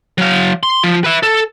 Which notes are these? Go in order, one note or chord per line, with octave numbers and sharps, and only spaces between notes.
F#3 F5
C6
F3
B4 E5
A4